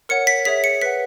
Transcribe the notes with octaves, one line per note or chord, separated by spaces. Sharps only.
A#4 C#5 F#5 C#7
B6
G#4 C#5 E5 B6
C#7
B4 F#5 B6